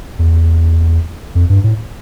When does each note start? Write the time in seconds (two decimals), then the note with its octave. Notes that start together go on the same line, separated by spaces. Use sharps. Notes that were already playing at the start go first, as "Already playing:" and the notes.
0.19 E2
1.35 F2
1.50 G2
1.64 A2